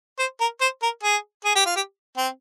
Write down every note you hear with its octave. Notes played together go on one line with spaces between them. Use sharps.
C5
A#4
C5
A#4
G#4
G#4
G4
F4
G4
C4